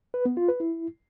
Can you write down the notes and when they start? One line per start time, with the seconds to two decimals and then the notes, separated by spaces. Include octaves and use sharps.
0.14 B4
0.25 B3
0.37 F4
0.49 B4
0.60 E4